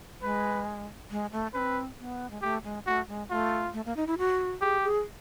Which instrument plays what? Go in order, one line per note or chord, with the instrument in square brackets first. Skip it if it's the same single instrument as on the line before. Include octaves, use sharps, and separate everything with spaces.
[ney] G#3 [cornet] B4
[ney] G#3
A3
[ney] C#4 [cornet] B4
[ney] C4
B3
G#3
[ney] A3 [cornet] G4
[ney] G#3
[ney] A3 [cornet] F#4
[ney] G#3
[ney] A3 [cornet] F4
[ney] A3
A#3
D#4
E4
F#4
[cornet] G4 [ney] G#4
[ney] G#4